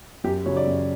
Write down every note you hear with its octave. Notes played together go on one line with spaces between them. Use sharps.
F#2 G4
C#3 F#3 C#5
D5
F#2